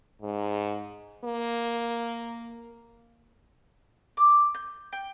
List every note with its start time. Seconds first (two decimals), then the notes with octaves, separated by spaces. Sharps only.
0.22 G#2
1.24 A#3
4.17 D6
4.55 G6
4.92 G5